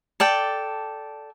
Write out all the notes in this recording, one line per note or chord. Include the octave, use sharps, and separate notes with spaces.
A4 D5 G5